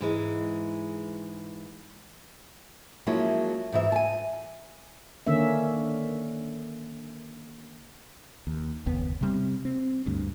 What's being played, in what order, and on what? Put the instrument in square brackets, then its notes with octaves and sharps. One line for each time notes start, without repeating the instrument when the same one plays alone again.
[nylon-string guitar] G#2 E3 G#3
F3 F#3 G#3 A#3 C#4 E4
G#2 E3 E5
G#5 A5
[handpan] D3 D#3 A#3 C#4 E5
[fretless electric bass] D#2
F#1 D#2 B3
C3 G3 C4
C4
D2 G2